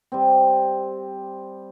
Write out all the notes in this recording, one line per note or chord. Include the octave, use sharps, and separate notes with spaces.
G3 C4